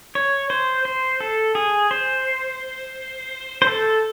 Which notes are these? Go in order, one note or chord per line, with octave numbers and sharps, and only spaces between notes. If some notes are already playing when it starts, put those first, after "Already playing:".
C#5
C5
C5
A4
G#4
C5
C5
A4